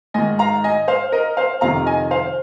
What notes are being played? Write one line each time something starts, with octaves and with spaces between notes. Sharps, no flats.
G#2 D#3 D#5 G#5
F5 A#5
D#5 G#5
C5 F5
A#4 D#5
C5 F5
F2 C3 D#3 F5 A#5
D#5 G#5
C5 F5